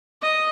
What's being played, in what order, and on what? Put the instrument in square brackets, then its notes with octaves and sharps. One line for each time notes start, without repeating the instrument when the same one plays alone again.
[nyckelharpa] D#5